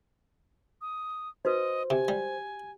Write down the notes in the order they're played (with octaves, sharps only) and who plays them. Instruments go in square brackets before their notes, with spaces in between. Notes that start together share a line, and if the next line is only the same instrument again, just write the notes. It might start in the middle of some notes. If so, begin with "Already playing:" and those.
[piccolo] D#6
[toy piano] D#4 F#4 B4 [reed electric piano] C5 [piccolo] D#5
[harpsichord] C3 [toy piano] G4 [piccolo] G#5
[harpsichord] G3